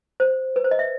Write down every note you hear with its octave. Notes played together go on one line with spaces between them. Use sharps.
C5
B4
C5
D#5
E5